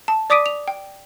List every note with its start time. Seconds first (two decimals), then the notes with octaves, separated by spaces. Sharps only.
0.08 A5
0.30 D5 D6 D#6 B6 D7 D#7
0.46 F7
0.68 G5